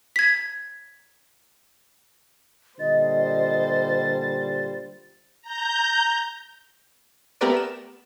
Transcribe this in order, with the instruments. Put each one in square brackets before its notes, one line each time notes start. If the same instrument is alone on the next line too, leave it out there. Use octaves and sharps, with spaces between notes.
[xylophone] G#6 B6
[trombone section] A#2 D3 G3 [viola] C5 [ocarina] D#5 [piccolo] A6
[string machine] A#5 G6
[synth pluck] A3 B3 G4 A#4 B4 D5
E7